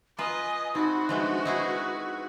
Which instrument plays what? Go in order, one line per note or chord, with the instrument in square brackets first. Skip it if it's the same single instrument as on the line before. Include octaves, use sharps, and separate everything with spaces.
[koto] F4 B4 [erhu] D#5 [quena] G#5 [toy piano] A#5
[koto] C4 [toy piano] D#4 E5 [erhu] F#4 [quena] B5
[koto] F3 G#3 A3 [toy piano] D4 C5 E5 [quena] B4
[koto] D#4 E4 G#4